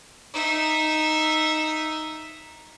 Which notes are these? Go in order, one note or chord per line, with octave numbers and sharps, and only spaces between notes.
D#4 E5